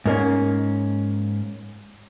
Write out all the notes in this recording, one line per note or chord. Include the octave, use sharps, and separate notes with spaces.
G#2 A#3 C#4